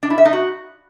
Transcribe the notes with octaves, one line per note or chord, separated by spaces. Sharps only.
D4
E4
E5
D#4
F#4